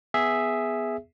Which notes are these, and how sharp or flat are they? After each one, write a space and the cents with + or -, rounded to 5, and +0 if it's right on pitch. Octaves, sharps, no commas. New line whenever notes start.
B3 +0 G#4 +0 E5 +0